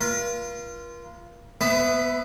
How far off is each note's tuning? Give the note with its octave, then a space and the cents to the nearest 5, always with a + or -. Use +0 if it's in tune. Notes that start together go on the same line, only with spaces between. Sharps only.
F4 -20 A#4 +45
B3 +0 B4 +40 E5 +0